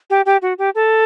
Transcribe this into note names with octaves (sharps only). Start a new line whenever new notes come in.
G4
G4
F#4
G4
A4